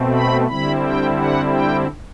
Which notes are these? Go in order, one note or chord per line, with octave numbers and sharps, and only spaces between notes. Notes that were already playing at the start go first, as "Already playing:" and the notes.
Already playing: B2 A3 C4
B5
D3 G3 C4 E4 B5
G5
F#5
G5